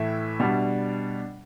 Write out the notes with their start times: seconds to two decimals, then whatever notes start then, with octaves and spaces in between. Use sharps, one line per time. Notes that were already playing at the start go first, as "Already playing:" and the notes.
Already playing: A2 E3 A3 E5
0.40 B2 G3 D4